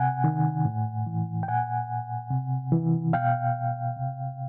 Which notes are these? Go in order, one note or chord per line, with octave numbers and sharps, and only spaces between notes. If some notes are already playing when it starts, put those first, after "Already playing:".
Already playing: C3 F#5 G#5
D#3
A2
E3
G5
A#2 F#5 G#5
C3
E3
B2 F5 G5
C3